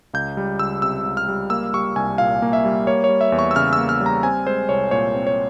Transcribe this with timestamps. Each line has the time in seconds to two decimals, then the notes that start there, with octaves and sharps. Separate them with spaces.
0.14 C#2 G6
0.37 G3
0.59 C#2 E6
0.82 C3 E6
1.06 C#2
1.17 F6
1.28 G3
1.50 A#3 E6
1.74 G3 C#6
1.96 C2 G#5
2.18 A#2 F5
2.42 A#3
2.53 E5
2.65 G3
2.87 A#3 C#5
3.04 C#5
3.09 G3
3.21 E5
3.32 E2
3.39 C#6
3.51 E6
3.56 C#3 F6
3.73 E6
3.78 A#3
3.89 F6
4.00 G3
4.06 A#5
4.23 C4 G#5
4.47 G#3 C5
4.69 C2 C#5
4.91 A#2 C#5
5.15 C4
5.27 C#5